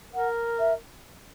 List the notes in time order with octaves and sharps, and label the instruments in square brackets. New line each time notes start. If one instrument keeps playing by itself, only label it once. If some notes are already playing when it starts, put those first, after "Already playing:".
[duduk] A#4 [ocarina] F#5
[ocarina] E5